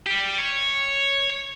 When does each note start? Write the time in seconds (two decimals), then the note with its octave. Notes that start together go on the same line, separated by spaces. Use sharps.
0.06 G3 G4
0.38 C#5